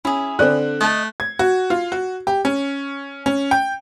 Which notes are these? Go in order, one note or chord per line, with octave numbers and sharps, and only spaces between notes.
C#4 E4 G#4
D3 C4 A4 D5 F#6
A3 D#5 A5
G#6
F#4
F4
F#4
G4
C#4
C#4
G5